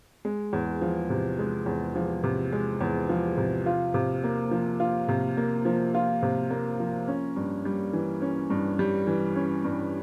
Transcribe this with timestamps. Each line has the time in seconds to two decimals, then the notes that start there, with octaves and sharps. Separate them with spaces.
0.25 G#3
0.53 E2
0.82 F3
1.10 C3
1.39 G#3
1.66 E2
1.96 F3
2.23 C3
2.52 G#3
2.81 E2
3.09 F3
3.38 C3
3.66 F4
3.94 C3
4.24 A#3
4.51 F3
4.80 F4
5.08 C3
5.37 A#3
5.65 F3
5.95 F4
6.22 C3
6.50 A#3
6.80 F3
7.08 C#4
7.36 G2
7.65 G3
7.93 E3
8.22 C#4
8.50 G2
8.79 G3
9.07 E3
9.36 C#4
9.64 G2